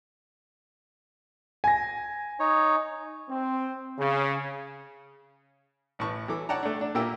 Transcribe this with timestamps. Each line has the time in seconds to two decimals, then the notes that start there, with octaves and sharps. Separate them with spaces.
1.64 G#5 A#6
2.40 D#4 C#5
3.29 C4
3.98 C#3
5.99 A1 A2 B4 A5 C#6
6.28 E3 F#3 A4 D6
6.49 C#5 D5 F#5 G5 A5 A#5
6.63 A3 D4
6.81 D4
6.95 A#2 A#3 E4 G4 G5 E6